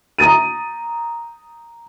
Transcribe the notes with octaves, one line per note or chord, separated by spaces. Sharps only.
A#5 D#6 A6 D#7